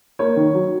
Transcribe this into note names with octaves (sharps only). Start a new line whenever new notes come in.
A#3 C#5
D#3
F#3